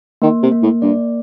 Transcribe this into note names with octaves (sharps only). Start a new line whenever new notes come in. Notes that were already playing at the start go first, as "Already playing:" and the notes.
D#3 A#3
C3
A#3
A2
G2 D5